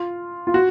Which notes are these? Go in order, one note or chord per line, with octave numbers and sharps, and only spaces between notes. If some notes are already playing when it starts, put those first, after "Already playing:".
Already playing: F4
F4
F#4